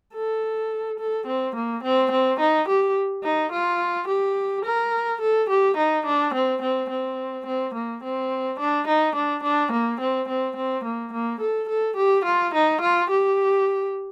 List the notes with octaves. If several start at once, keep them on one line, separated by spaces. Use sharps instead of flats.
A4
A4
C4
A#3
C4
C4
D#4
G4
D#4
F4
G4
A#4
A4
G4
D#4
D4
C4
C4
C4
C4
A#3
C4
D4
D#4
D4
D4
A#3
C4
C4
C4
A#3
A#3
A4
A4
G4
F4
D#4
F4
G4